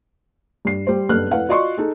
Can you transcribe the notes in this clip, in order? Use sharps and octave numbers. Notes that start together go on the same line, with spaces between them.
G2 C7
G3 C5
F#1 G2 B3 A4 F6 F#6
F1 E4 B4 F5 F#5
F4 F#4 D5 D#5 C6 C#6
D#4 G#4 A4